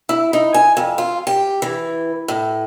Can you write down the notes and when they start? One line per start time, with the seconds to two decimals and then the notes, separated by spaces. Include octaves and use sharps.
0.09 E4
0.33 D#4
0.54 G#5
0.77 F2
0.98 F4
1.27 G4
1.62 E3
2.28 A2